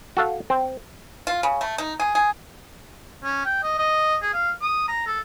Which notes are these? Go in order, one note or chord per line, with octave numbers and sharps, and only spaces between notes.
F#4 A4 F5
C4
F4
C#3
A3
D#4
G#4
G#4
C#4
G5
D#5
D#5
G#4
F5
D#6
A#5
A4